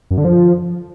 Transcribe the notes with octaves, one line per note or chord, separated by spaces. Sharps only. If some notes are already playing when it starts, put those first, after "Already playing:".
F#2
D3
F3